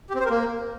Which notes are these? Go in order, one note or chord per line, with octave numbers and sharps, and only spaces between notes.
G4
C4
C5
A#4
A#3